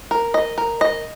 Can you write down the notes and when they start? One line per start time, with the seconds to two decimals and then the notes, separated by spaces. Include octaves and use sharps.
0.11 A#4
0.34 D#5
0.58 A#4
0.81 D#5